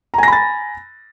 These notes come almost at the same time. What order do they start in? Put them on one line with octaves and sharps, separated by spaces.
A#5 G#5 A#6 B5 A6